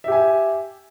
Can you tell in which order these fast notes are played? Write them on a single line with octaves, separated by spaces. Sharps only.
E5 G4 G#5